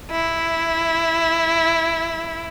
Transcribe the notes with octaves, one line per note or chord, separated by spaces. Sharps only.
E4